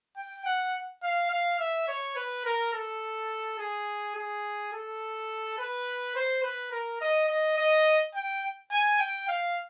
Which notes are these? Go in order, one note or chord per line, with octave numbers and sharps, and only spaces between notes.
G5
F#5
F5
F5
E5
C#5
B4
A#4
A4
G#4
G#4
A4
B4
C5
B4
A#4
D#5
D#5
D#5
G5
G#5
G5
F5